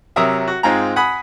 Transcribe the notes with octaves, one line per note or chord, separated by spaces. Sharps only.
C3 F#3 A#4 E5 D#6
F#4
G#2 G#3 C4 F4 G#4 A#5
F#5 G#5 B5 D#6